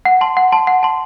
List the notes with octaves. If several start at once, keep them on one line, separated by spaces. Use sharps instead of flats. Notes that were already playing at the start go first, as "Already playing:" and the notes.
F#5
A5 C6
F#5
A5 C6
F#5
A5 C6